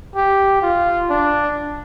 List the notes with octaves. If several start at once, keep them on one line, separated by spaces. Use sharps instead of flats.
G4
F4
D4